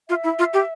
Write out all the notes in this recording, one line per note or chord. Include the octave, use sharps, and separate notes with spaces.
F4 E5
E4
F4
G4